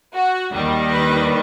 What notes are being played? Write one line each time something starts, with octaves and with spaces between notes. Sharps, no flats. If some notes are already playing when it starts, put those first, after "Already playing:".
F#4
D#2 D#3 G3
B4